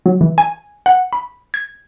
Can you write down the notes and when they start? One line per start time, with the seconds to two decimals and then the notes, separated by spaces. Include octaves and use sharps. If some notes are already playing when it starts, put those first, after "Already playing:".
0.06 F#3
0.21 E3
0.38 G#5
0.86 F#5
1.13 B5
1.54 G#6